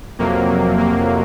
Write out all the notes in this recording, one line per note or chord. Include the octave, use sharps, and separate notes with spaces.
F2 C3 F#3 A#3
A#3